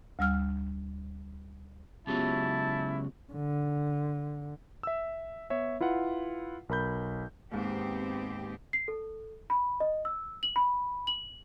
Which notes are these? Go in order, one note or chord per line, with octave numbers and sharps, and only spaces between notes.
D2 G3 E6 F6
C#2 C#3 F#3 B3 E4 F4 G4 A5
D3
E5 E6
B3 C#5 E5
E4 F4 B4 F#5
B1 A#4 B5 G6
D#2 G#2 B3 C4 G4
C7
A4
B5
D#5
E6
F#7
B5
F#7